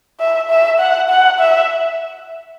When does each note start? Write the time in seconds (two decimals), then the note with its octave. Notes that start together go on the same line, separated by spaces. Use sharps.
0.20 E5
0.50 E5
0.80 F#5
1.10 F#5
1.39 E5